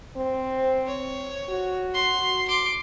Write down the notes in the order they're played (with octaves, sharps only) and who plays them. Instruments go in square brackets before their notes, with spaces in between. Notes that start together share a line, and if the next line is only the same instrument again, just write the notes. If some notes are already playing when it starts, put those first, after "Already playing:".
[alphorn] C4
[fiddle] C#5
[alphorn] F#4
[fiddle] C6
C6 D6